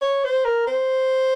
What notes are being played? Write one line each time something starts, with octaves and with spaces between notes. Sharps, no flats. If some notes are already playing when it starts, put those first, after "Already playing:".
C#5
C5
A#4
C5